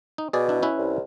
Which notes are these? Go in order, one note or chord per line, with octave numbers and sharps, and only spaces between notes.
D#4
B2 G#4 D5
D4 E4
C#4 E4 B4
C2